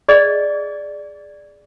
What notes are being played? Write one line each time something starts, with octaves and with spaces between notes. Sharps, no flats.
G#4 D5 D#5